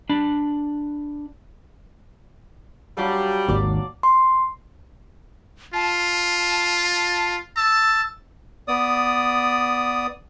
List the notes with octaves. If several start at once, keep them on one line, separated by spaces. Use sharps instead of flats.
D4 B5
F#3 G3 D4 F5
G#1 D#2 D5
C6
F4 A5
A5 E6
B3 D5 D#6